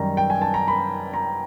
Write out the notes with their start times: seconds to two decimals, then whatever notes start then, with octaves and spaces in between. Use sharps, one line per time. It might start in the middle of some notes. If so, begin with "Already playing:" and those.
Already playing: F#2 D#3 G3 A#5
0.17 G5
0.30 G#5
0.42 A5
0.54 A#5
0.68 B5
1.14 A#5